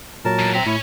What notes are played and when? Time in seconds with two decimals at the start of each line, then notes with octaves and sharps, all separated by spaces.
0.25 A#2 F#3 A#4 A5
0.39 B2 E3
0.54 C4 E5 A#5
0.66 A2 C#4 E4